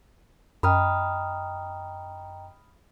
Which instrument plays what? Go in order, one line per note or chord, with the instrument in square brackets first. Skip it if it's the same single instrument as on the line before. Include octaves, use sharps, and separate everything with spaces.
[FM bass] F#2 [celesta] D#5 G5 A#5 [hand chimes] B5 D#6 F6